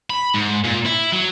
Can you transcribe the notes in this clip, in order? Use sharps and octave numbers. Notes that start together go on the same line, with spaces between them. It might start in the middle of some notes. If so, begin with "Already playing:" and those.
B5
G#2
A#2
E4
F#3